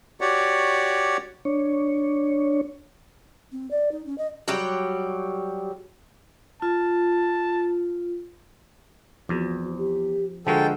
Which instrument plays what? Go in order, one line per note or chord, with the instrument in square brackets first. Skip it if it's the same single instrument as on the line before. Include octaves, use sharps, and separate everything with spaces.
[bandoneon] F#4 G4 C#5 D5 F#5
[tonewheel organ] D4 C#5
[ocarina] C4
D5
D#4
C#4
D#5
[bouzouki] F#3 G3 G4
[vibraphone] F4 [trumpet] A5
[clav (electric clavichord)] E2 [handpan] F3 C4 [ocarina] F#4
[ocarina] G4
[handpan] D3 A#4 [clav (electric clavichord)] F3 G#3 F#4 [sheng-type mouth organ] A4 G5 [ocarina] D#5